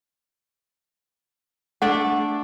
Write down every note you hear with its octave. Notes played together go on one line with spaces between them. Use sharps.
A3 D4 D5 F#5